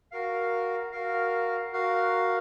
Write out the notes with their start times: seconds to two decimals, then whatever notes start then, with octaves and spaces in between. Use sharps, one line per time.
0.12 F#4 A#4 F5
0.92 F#4 A#4 F5
1.73 F#4 A#4 F5